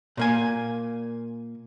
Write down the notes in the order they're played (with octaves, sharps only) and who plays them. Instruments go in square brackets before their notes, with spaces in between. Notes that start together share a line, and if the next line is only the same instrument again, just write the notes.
[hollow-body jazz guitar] A#2 A#3 G#5